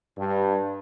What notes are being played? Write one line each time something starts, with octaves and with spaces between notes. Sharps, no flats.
G2